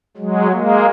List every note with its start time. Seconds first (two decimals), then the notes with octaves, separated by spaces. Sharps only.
0.17 F#3 G#3
0.51 G#3 A#3